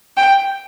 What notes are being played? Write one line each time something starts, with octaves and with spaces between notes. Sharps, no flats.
G5